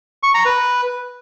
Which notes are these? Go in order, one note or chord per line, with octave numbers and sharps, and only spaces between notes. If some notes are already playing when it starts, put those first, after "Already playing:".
C#6
A#5
B4